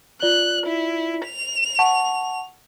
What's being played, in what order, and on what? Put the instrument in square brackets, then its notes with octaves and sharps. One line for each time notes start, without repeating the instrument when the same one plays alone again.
[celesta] F4 D5 G7 [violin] F#6
[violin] E4
F7
[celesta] F#5 A5 C#6